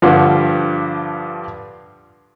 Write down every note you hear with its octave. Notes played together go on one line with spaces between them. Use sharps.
G2 D3 F3